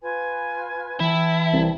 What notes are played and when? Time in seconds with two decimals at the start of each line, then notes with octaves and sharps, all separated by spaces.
0.01 F4 B4 G#5
1.00 E3 E4 G5 A5
1.53 C2